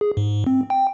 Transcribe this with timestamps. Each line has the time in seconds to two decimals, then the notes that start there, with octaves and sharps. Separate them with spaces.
0.01 G#4
0.17 G#2
0.47 C4
0.70 G5